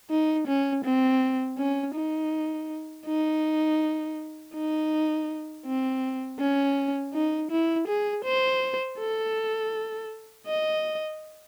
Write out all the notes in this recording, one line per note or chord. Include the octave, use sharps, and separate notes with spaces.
D#4
C#4
C4
C#4
D#4
D#4
D#4
C4
C#4
D#4
E4
G#4
C5
A4
D#5